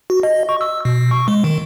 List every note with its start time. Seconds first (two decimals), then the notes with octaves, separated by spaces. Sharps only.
0.10 F#4
0.23 D#5
0.49 C#6
0.61 E6
0.85 B2
1.11 C#6
1.28 G#3
1.44 D#3